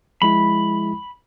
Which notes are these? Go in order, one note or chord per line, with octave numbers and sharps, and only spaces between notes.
F3 G#3 E4 B5